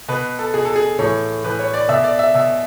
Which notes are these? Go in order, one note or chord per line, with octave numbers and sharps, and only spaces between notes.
B2 B4
A4
B2 G#4
A4
G#4
A2 E3 C#5
A2 E3 B4
C#5
D5
B2 E5
D5
E5
B2 E5